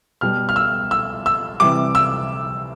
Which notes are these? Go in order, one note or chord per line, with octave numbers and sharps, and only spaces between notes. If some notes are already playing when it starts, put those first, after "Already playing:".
B2 G3 F6
F6
E6
E6
E6
C3 E3 G3 D6
E6